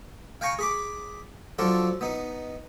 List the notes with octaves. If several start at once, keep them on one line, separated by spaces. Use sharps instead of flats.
F5 G5 G#5 A#5 C#6
G#4 B5 D6
F3 F#3 D4 F4 A4
B3 D#4